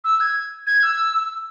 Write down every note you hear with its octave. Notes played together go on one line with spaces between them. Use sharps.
E6
G#6
G#6
E6